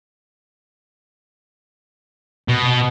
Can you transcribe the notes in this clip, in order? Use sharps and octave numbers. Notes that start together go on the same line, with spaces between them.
B2